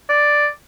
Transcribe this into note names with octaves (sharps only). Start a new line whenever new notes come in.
D5